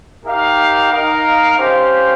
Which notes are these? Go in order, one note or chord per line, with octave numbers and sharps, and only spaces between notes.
D#4 G4 A#4 F5
D#4 A#4 F5
C#4 G4 C5 F5